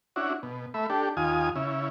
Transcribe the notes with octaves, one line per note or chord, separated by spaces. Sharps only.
C#4 D4 E4 F#4
B2
A3 E5 B5
D4 G4 A4
D#2 F4 G#5 D#6
C#3 E4